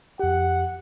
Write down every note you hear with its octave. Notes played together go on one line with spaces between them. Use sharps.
F2 G4 F#5